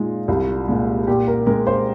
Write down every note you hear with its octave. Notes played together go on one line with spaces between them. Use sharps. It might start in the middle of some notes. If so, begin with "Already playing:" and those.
Already playing: A#2 G#3 D#4 F4
C2
A#2 G#3
A#2 G4
A#4
G#3 A#4
C5